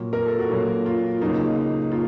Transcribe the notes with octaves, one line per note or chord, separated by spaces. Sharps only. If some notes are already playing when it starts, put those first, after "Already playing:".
Already playing: A#2 F#3 A#3
A#4
A4
F#4
A#2 F#3 A#3 F4
F4
C#2 C#3 F#3 A#3 D#4
A#3 F4